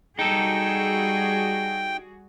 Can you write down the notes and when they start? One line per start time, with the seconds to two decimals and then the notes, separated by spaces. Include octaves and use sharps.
0.19 G3 D#4 F#4 G#4 A4 G5